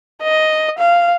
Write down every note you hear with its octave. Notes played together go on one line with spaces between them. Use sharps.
D#5
F5